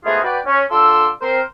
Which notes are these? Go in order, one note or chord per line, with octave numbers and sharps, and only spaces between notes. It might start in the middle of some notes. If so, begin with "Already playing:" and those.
G#2 A3 B3 F4 F#4 G#4
F#4 B4 D5 G5
C#4
D3 F4 A4 C6 D6 E6
C4 A#4 C5